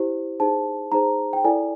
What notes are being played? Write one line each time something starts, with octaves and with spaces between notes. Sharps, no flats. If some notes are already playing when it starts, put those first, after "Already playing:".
Already playing: E4 G4 C5
D#4 G#4 C5 A5
D#4 G#4 C5 A#5
G5
E4 A4 D5 G#5